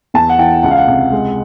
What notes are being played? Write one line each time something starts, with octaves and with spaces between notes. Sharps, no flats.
E2 A5
F#5
E3 G5
C#2 F#5
F5
F#5
C3
G#3